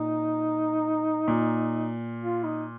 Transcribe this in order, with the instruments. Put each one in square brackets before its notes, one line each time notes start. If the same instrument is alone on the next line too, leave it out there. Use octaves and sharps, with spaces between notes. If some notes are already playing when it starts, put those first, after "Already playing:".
Already playing: [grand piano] A#2 [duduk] D#4
[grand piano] A#2
[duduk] F4
D#4